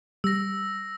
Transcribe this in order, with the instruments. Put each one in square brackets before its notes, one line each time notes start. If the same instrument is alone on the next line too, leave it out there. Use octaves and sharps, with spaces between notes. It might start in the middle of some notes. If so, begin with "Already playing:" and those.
[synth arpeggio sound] G3 [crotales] E6 A#6